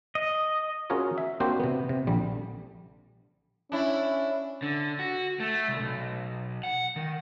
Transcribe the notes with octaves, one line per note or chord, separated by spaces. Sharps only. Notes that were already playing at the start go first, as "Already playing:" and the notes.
D#5
C#4 F4 F#4 G#4 A#4 C#5
E5
A#3 C4 D4 F#4 G4 C5
C3 B3
C3
A#1 D3 G3
C#4 D4 E4
D3
F#4
A3
C2
B1
F#5
D#3